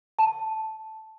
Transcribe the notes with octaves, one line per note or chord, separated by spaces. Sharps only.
A5